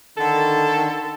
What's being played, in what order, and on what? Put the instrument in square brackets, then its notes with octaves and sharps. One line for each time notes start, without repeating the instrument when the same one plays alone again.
[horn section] D3 D#3 A4